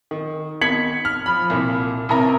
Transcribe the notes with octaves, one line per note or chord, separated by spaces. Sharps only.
D#3
D#3 B3 G#6 B6 C#7 F#7
F6
F3 B5
C2 A#2
A1 C3 A#4 A#5